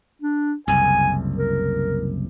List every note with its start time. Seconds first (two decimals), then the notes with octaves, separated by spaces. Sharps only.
0.21 D4
0.68 F#1 C2 G#5
1.37 A#4